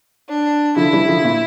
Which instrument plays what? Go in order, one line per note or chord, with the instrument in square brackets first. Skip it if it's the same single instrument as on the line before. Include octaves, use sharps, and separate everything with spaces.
[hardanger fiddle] D4
[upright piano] D3 F3 [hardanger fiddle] E4
[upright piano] E3 G3
D3 F3
A#2